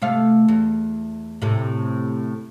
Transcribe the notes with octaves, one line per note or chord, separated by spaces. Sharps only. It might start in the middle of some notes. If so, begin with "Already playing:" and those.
C3 A3 F5
E2
A2 C3